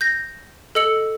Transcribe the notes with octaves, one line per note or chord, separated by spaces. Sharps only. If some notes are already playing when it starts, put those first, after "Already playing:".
G6 A#6
A4 D#5 E6 C#7 F#7